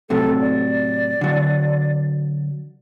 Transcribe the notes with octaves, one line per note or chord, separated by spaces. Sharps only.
A2 C3 F#3 A4
D5
D3 F#3